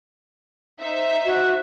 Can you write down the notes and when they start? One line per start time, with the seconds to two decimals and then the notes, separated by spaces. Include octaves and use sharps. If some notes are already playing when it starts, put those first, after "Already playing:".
0.80 D#4 C5 E5
1.25 F#4